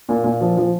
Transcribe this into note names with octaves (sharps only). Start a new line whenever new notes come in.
A#2
A#2
F3
F3